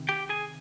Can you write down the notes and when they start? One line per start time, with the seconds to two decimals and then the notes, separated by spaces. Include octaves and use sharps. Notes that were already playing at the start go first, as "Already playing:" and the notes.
Already playing: C3 D#3
0.09 G4 G5
0.29 G#4 G#5